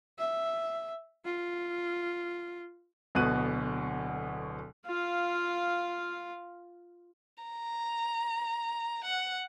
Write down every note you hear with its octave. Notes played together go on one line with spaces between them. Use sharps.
E5
F4
D1 D2 B2 B3 F#6 D#7
F4 F5
A#5
F#5